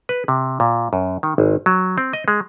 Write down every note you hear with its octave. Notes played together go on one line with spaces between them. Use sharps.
B4
C3
A#2
F#2
D#3
G#1
F#3
C4
D#5
G#3